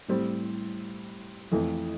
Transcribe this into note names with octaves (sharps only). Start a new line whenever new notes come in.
A2 G3 C4
F2 E3 A3